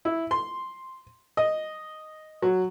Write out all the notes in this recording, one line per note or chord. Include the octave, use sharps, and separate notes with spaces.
E4
C6
D#5
F#3